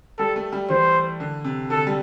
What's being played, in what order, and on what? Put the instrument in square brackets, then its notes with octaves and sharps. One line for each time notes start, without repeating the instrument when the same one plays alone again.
[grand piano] G3 [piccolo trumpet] A4
[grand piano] A3
G3
[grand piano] E3 [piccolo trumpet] C5
[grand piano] D3
C3
[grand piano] D3 [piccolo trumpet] A4
[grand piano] G3